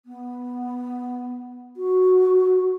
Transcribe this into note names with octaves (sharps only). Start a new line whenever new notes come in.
B3
F#4